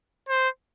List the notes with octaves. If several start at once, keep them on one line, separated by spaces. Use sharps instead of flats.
C5